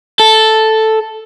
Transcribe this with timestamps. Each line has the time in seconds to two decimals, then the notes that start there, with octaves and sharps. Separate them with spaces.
0.20 A4